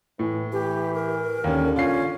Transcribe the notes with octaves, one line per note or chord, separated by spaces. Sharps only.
A2 E3
E3 G4
A#4
D#2 D3 C#4
C#4 F4 C7